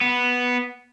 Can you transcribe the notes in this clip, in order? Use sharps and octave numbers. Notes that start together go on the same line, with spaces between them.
B3